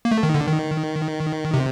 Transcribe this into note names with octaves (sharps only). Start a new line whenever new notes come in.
A#3
A3
D#3
D3
D#3
C3